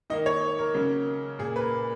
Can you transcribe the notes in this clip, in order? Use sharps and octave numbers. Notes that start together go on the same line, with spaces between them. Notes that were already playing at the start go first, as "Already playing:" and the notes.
D#3 A#3 D#5
C#5
A#4
C#3 F#3 A#3
A#2 A#3 G#4
B4
A#4